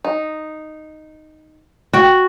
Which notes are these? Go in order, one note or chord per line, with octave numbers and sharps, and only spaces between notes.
D#4
F#4 G5